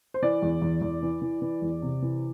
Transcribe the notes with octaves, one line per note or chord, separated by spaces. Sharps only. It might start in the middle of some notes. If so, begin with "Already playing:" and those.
C5
E3 D5
E2
E2
E2
E3
E3
E3
E2
C3
E3